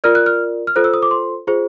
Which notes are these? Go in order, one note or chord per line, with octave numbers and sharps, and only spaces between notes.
F4 A#4 D5 F6
F#6
F6
F6
F4 A4 C5 F#6
E6
D#6
D6
C6
F4 G#4 C5